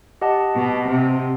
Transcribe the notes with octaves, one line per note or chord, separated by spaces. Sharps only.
G4 D#5 F#5 A5
B2
C3